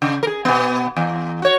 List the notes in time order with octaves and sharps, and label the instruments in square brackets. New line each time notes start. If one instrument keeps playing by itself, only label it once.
[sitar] C#3
G#4 A#4
B2 B3
E2
F#4 C#5